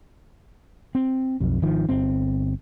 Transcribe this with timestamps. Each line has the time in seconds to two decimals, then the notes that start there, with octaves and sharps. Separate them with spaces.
0.95 C4
1.41 B1 F2
1.62 G#1 D#3 F3
1.89 G1 C4